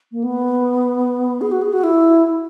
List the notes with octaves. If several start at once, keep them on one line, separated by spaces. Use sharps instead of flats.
A#3
B3
G#4
F#4
G#4
F#4
E4